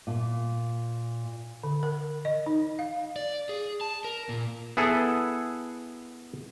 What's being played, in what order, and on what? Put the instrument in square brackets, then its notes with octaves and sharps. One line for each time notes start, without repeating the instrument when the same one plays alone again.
[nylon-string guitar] A#2
[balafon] D3
A#4
D#5
D#4
F5
[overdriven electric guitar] D5
G#4
A5
A#4
A#2
[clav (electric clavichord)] B3 E4 G#4 A4